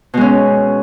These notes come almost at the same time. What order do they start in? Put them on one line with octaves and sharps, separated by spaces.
B2 G#3 C#4